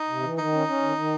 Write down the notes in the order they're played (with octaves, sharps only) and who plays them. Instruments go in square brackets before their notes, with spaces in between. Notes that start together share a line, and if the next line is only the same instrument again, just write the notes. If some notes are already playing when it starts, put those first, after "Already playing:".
Already playing: [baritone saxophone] D#4
[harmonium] C3
E3
[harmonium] D#3 [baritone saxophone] D#4
[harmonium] C#4
C#4
D#3
D#3